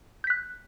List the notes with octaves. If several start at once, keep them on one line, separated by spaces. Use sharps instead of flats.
F#6 G6 B6